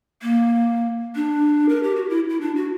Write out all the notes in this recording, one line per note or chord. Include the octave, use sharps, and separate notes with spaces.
A#3
D4
A#4
G4
F#4
E4
E4
D4
F#4